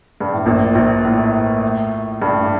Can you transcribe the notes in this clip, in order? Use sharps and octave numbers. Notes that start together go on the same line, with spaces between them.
G2
A2
A#1 A#2
A#1 A#2
A2
G2